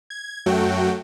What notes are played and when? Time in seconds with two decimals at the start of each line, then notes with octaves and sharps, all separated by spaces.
0.10 G#6
0.46 F#2 F#3 A3 F#4 G5